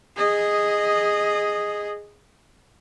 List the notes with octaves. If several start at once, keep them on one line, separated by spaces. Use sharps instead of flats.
G#4 D#5